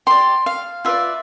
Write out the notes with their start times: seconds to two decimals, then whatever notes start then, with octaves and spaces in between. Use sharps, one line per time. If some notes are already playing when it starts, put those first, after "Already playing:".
0.07 G4 D5 C6
0.46 F5
0.85 F4 B4 D5 E5